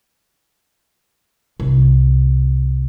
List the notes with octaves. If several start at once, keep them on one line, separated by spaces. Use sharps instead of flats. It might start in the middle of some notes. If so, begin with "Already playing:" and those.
C2